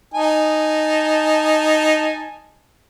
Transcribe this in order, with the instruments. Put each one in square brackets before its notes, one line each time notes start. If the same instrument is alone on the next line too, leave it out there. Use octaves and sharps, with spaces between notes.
[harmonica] D#4 G#5 A5